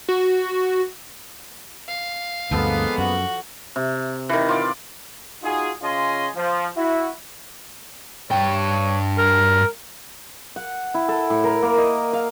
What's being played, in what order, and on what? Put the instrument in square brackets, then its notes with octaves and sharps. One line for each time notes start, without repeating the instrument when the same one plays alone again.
[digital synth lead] F#4
[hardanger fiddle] F5
[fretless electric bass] D2 G2 [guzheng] F3 A4 [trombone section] G#3 A#3 B3
[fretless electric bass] F#2 [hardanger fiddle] F#4
[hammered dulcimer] C3
D#3 E3
F4 D5
[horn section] D#4 F4 F#4 G#4
C#3 C#4 F4 D#5 G#5 C6
F3
E4 F#4
[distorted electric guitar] G2 G5 [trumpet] C#5
[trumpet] A#4
[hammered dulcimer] F#5
E4
A4
A2
A#4
A#3
D#5
F5